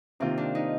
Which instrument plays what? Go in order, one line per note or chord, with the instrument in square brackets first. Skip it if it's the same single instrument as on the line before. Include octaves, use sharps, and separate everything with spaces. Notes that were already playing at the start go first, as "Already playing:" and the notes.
[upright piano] C3 D#3 A#3 F4 [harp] C4
[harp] D4
D#4